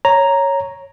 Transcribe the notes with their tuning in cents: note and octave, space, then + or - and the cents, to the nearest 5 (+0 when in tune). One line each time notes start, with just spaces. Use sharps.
C#5 +0 A#5 +0